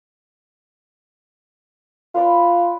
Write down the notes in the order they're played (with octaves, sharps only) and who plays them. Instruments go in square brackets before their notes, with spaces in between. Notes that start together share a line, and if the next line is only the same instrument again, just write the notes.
[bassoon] F4 [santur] B4 D5 B5